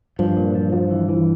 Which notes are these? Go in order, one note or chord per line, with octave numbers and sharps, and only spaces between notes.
G2 F3
A#2
F3
F3
E3
E3